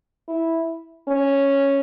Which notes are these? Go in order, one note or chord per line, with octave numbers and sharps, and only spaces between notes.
E4
C#4